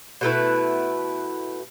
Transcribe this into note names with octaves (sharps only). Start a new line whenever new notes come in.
B2 A3 E4 B4